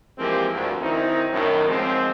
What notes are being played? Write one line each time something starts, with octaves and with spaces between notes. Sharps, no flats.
E3 F3 G#3 A#3 C4 G4
D2 G2
F#2 D#3 C4 D#4 E4
F#2 A2 D#3
G#2 F3 G#3 C4